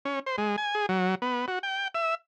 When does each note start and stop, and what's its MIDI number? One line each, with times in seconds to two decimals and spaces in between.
0.05 0.19 61
0.26 0.36 72
0.38 0.56 56
0.58 0.75 80
0.75 0.86 68
0.89 1.15 54
1.22 1.46 59
1.48 1.59 66
1.63 1.88 79
1.95 2.15 76